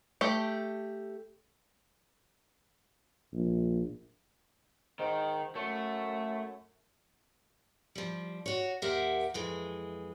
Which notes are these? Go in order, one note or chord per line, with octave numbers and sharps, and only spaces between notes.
A3 G4
A#1
G#2 D#3
F#2 A3
F3 G3
F#4 C#5
D#2 G4 A#4 C5 E5 F#5
F2 E3 G#3